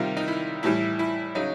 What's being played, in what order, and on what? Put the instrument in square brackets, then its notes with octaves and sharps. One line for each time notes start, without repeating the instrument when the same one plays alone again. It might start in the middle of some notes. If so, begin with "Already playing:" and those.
Already playing: [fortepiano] C3 D#3 G3 F4
D#4
E4
A2 E3 G3 E4
E4
C#3 F#3 D#4